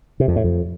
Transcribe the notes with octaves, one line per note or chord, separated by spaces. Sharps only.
C3
F2
A2
F2